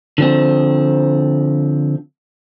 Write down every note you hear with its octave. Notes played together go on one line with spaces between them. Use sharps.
D3 F3 C4